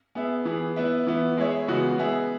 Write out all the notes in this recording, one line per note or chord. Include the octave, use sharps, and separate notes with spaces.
B3 G#4 E5
E3 B3 G#4
B3 E4 B4 E5
E3 B3 E4
G#3 E4 G#4 C#5 E5
C#3 E3 G#3 B3 F#4
B3 G#4 E5